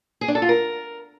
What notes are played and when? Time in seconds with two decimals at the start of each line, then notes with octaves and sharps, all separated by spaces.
0.21 G#4
0.28 D4
0.35 A4
0.42 F4
0.49 A#4